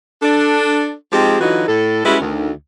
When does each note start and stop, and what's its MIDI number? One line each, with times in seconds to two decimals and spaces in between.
0.22 0.92 62
0.22 0.92 69
1.12 1.37 53
1.12 1.37 56
1.12 1.37 60
1.12 1.37 63
1.12 1.37 67
1.12 1.37 68
1.40 1.68 50
1.40 1.68 52
1.40 1.68 54
1.40 1.68 63
1.40 1.68 65
1.40 1.68 66
1.68 2.01 45
1.68 2.01 69
2.05 2.17 55
2.05 2.17 56
2.05 2.17 61
2.05 2.17 64
2.05 2.17 66
2.05 2.17 71
2.20 2.50 38
2.20 2.50 51